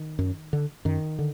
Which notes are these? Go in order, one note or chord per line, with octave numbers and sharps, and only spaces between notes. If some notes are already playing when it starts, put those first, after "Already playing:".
Already playing: D#3
F#2
D3
F#2 D#3
D3